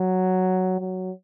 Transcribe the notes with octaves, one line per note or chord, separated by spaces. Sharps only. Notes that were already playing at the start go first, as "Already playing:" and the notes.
Already playing: F#3
F#3